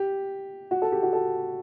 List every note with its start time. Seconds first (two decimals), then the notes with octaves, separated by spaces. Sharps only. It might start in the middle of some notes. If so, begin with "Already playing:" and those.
Already playing: G4
0.71 F#4
0.82 A4
0.92 G4
1.03 F#4
1.13 A4